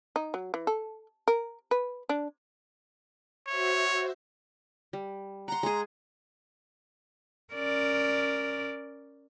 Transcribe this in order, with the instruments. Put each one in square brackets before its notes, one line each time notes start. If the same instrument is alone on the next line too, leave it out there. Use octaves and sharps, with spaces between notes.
[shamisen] D#4
F#3
E3
A4
A#4
B4
D4
[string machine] F#4 C5 E5 [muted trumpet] C#5
[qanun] G3
[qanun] F#5 C6 [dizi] A#5
[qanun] G#3 G#4
[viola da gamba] C#4 A#4 D5